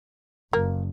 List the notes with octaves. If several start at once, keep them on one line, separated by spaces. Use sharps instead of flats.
F#1 A#3